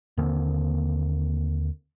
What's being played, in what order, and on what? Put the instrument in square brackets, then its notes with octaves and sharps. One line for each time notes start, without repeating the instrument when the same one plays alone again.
[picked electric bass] D#2 D3 A#3 C4